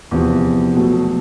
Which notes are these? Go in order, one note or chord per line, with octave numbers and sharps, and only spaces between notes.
E2 C3 F3
B2 F#3 A3